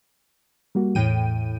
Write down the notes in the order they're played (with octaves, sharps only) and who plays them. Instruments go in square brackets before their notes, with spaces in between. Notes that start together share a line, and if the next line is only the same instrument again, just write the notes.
[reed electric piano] G3 A#3 F#4
[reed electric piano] E2 [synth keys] A2 G5 D#7